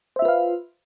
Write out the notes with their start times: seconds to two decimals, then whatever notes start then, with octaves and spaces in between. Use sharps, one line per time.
0.16 C5
0.19 E5
0.22 F4
0.25 B4
0.28 F5